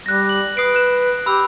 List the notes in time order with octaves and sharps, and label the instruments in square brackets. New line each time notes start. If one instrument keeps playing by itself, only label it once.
[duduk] G3 [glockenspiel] F#6 A#6
[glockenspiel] F#7
[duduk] B4 [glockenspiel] D#6 C7 D7
[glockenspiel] F#6 E7
[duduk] G4 [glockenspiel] B5 E6